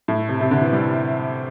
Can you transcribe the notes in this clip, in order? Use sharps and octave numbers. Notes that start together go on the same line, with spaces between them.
A2
C3
C3
D3
E3
G3